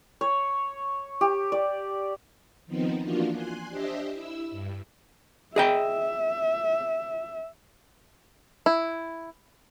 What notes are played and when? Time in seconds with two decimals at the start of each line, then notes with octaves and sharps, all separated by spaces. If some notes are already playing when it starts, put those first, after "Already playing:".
0.21 C#5
1.21 G4
1.52 D5
2.67 D#3 F3 B3 C4 D#4
3.02 E3 F3 A#3 D4 F4 F#4
3.32 G#5 C6 F#6
3.69 D4 G4 C5 D#5 E5
4.14 E4 E6
4.51 G2
5.56 G#4 D#5 E5 G5
8.66 E4